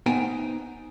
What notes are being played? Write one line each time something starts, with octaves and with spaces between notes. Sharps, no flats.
B3 D#4 C5 G5 G#5 A#5